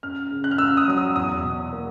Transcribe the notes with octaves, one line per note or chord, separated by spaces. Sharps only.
F#2 F6
C#3
F#6
F6
F#2 E6
D#6
F#3 D#6
E6
E2 D#6
B2
A#3